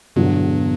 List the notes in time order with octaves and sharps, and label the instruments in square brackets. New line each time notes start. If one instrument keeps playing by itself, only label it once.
[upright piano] E1 E2 D3 F#3 [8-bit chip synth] G2